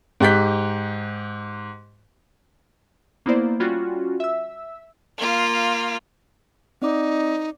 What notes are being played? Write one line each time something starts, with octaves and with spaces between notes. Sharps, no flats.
G#2 G4 F#6 G6 B6
A#3 B3 E4 C5 D5
G3 C#4 F4 F#4
E5 E6
A#3 F4
C4 D#4 D5 D6